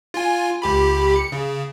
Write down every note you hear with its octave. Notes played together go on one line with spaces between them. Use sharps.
F4 G#5
C#2 G4 B5
C#7
C#3